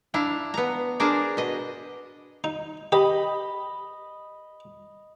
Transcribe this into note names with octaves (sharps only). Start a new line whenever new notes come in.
D4 E4 F5 A#5
B3 A#5
D4 G#4 A#4 C5 D5 A#5
B2 D#5
D#4
G4 D#5 B5